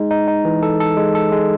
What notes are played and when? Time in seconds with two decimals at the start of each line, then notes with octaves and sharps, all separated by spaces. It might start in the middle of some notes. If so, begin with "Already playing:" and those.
Already playing: G#3 D#4
0.11 D#4
0.28 D#4
0.45 E3
0.63 A4
0.80 A4
0.97 G#3
1.15 A4
1.32 G#3